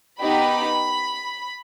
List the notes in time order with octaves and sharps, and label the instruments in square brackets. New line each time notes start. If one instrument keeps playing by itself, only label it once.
[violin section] B3 D#4 G4 B5